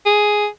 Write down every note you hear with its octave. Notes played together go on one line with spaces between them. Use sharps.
G#4